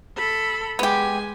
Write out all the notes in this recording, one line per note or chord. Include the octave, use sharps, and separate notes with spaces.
A4 B5
G#3 B3 G4 G#5